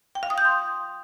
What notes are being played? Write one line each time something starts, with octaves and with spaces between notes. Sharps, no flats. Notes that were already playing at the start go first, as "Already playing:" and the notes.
G5
F5
D#6
G6
C6